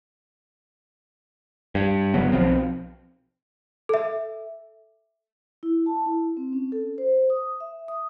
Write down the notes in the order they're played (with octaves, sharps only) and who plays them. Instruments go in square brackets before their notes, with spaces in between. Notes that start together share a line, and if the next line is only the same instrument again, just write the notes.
[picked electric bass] G2
G1 C#3 F#3 B3
B1 B2 F3 C4
[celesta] A4 E5
[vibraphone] E4
A5
E4
C4
C#4
A4
C5
D#6
E5
D#6